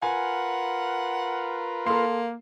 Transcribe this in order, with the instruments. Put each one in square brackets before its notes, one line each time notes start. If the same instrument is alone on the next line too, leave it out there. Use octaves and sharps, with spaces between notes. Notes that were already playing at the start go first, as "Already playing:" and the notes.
[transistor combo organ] F4 A#4 B4 [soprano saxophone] F#5 [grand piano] G#5
[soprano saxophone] A#3 [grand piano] A4 C6